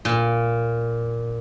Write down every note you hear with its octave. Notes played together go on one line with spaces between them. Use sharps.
A#2